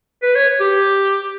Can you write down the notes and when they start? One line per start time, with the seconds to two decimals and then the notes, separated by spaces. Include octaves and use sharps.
0.23 B4
0.36 C#5
0.60 G4